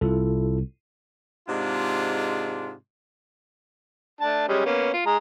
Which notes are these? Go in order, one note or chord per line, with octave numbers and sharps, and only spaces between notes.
C2 E4 F4 A4
G#2 C3 G#3 D4 F4
A3 D4 A5
G3 G#3 C#4
A#3 B3 C#4
F4
G#3 A#5